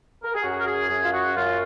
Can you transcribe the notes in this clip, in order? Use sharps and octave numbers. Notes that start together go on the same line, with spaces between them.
A#4
G#4
F#2 F#4
A#4
G#4
F#2 G#4
F4
F#4
F#2 F4